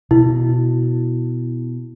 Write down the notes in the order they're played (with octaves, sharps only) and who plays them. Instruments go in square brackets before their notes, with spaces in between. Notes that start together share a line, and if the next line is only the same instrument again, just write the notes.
[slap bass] B2 [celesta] E4